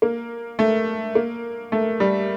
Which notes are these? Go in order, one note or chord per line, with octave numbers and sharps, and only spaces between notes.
A#3
A3
A#3
A3
G3